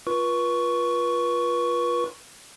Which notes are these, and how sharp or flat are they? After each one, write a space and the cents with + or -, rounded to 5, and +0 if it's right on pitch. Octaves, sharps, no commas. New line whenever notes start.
F4 +0 B4 -30 C#6 +10